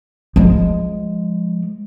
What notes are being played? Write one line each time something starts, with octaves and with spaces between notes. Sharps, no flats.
F3 G#3